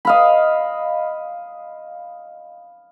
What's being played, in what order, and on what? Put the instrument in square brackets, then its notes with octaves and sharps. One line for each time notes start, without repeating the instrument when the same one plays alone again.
[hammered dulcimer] D#5 F5 B5